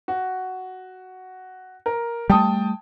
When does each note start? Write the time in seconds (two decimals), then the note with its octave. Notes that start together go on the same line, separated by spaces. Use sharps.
0.08 F#4
1.86 A#4
2.30 G3 A3 G5 A5 D#6